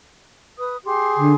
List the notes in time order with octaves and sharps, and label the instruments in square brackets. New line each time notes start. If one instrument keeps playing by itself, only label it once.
[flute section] B4 D#6
G4 G#4 C6
[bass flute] D3